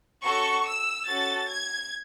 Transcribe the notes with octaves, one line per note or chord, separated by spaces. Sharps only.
C#4 F#4 A4 C#6
E6
C#4 F#4 A4 A6
G#6